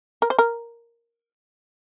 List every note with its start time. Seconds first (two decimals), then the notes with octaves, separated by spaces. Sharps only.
0.22 A#4
0.30 C5
0.39 A#4